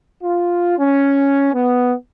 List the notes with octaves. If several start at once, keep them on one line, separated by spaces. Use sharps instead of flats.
F4
C#4
B3